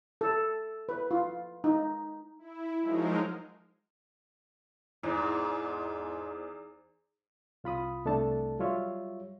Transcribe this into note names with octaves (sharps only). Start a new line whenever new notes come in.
A4
B4
F4
D#4
E4
F3 F#3 G#3 D#4 A#4 C5
E2 G#2
C2 F4 B5 D#6
C2 A3 D4 A4 A5
F#3 G3 F4 C#5 E5